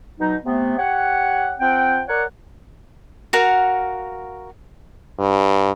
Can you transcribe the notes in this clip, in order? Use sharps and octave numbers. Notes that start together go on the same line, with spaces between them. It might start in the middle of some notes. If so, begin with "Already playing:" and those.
B2 F#3 D#4
C3 A3 B3
G4 C#5 F#5
F3 C4 F#5 G5
A#4 C#5 D5 F#5
F#4 A#4 F5 F#5
G2